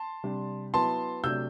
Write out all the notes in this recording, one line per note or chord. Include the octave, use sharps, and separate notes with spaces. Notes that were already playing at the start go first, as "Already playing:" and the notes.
Already playing: A5 C6
C3 G3 D4
F#3 B3 E4 A5 C6
C3 F#3 A3 D4 E6 G6